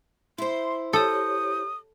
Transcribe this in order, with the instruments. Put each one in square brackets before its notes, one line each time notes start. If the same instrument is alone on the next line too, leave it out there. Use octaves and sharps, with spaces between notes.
[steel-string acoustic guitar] E4 C5 [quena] C6
[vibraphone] G4 C#5 [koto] A4 [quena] D#6